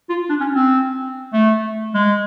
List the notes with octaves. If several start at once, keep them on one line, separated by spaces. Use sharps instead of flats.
F4
D4
C#4
C4
A3
G#3